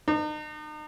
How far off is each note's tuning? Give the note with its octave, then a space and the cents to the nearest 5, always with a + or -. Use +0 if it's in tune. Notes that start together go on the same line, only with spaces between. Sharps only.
D#4 -40